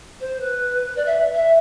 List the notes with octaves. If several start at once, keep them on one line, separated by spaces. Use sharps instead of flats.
C5
B4
D5
E5
E5